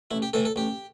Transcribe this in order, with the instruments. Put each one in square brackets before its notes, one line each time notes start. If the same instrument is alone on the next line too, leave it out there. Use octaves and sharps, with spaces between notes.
[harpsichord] A1 E4
G4
A2 E3 A4
A4
A1 G4